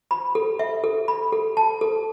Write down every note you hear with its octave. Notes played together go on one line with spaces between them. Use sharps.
B5
A4
E5
A4
B5
A4
A5
A4